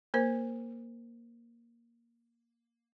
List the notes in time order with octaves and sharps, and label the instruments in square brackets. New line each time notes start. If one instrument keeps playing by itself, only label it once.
[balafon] A#3 A#4 C5